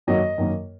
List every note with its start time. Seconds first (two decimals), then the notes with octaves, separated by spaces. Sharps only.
0.07 F#2 D#3 F#3 A#3 D#5
0.38 F#2 D#3 F#3 A#3